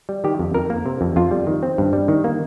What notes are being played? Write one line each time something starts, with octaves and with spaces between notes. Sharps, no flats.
G3
D#3 G4
F2
F2 A#4
A#3
C3
F2
F2 F4
G3
D#3
C4
G2
G3
D#3
A#3